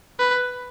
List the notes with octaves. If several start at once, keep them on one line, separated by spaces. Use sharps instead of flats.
B4